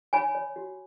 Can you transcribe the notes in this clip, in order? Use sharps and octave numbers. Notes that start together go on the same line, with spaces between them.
C#5 G#5 B5
C#5
F#4